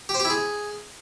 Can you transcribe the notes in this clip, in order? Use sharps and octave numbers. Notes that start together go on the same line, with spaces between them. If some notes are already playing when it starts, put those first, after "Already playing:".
G4
C5
G4
E4
G#4